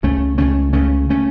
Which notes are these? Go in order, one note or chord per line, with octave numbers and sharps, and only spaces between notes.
C#2 C#3 A3 C#4
C#2 C#3 A3 C#4
C#2 C#3 A3 C#4
C#3 A3 C#4